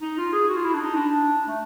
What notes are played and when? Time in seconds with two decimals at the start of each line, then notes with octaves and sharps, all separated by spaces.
0.02 D#4
0.18 F4
0.33 G#4
0.48 F#4
0.57 F4
0.64 E4
0.74 D4
0.80 D#4
0.96 D4
1.47 A3